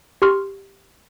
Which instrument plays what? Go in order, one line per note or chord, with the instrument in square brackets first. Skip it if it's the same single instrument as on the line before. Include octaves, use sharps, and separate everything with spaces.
[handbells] G4 C6 C#6 F6